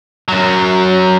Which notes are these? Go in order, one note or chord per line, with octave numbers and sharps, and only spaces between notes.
F#2 F#3